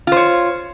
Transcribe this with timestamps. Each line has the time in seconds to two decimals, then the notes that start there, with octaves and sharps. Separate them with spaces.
0.07 F4
0.12 C5
0.17 C#5